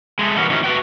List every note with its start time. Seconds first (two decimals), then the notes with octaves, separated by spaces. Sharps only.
0.19 G#3 A3
0.37 E3 G3 B3 C#4 F#4 A#4
0.50 D#3 E3 A3 C#4 F#4
0.64 A3 F#4 B4 G5